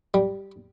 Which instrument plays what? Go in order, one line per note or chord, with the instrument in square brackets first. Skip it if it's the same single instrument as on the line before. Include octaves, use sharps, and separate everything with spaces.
[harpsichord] G3